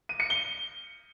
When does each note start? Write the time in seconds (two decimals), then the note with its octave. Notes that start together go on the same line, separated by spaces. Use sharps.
0.09 D#7
0.20 C#7
0.30 G7